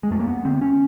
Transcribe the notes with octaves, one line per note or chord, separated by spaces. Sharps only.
G#3
F2 A3
A#3
B3
D3 C4
C#4